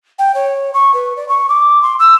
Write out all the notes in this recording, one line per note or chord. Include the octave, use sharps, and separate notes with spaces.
G5
C#5
C#6
B4
D5
C#6
D6
C6
E6